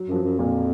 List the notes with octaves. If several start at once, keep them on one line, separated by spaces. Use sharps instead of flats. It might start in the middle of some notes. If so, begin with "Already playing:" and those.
Already playing: F#3
F#2 F3
F#3
F#2
F2 A#2 A#3